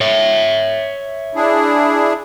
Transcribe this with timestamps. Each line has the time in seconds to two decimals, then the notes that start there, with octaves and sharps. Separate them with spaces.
0.01 C#5 E5
1.35 D4 E4 G#4